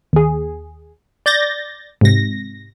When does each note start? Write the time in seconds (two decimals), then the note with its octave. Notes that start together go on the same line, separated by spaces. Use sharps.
0.13 D#2 G#4
1.26 D5 G6 A6 A#6
2.01 G#2 C3 A#6